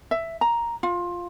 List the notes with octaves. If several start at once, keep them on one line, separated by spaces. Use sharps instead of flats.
E5
A#5
F4